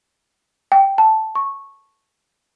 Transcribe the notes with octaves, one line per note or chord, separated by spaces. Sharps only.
G5
A5
C#6